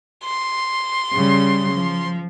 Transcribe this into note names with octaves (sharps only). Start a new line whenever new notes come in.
C6
C#3 G3
F3